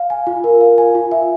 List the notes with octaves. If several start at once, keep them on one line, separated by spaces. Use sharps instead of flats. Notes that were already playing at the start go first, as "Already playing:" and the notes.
Already playing: F5
G#5
F4
A#4
F5
G#5
F4
E5